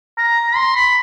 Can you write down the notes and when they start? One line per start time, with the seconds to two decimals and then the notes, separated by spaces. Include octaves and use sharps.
0.18 A#5
0.56 C6
0.76 B5